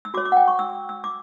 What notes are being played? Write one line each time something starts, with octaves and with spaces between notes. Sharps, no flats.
E6
F#4 C#5 D6
D6
F#5
G5
C#6
E6
E6
D6